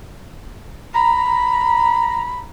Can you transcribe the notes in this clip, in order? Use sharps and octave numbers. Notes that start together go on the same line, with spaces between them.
A#5 B5